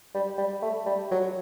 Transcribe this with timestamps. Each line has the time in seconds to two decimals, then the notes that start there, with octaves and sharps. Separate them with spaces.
0.15 G3
0.38 G3
0.62 A3
0.86 G3
1.11 F#3